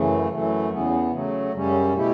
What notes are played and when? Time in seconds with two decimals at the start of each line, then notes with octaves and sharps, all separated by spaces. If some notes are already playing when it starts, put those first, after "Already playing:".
Already playing: F#2 C#3 E3 A3
0.29 F#2 E3 A3
0.71 E2 C#3 E3 B3
1.12 C#3 F#3 A3
1.53 F#2 C#3 G3 C#4
1.94 B2 A3 E4 G4